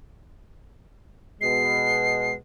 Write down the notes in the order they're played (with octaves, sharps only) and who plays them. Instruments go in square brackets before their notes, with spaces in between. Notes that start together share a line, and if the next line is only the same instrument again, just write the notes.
[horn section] B2 G#3 [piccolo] C7